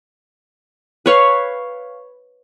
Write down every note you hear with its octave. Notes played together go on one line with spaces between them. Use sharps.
B4 C#5 F5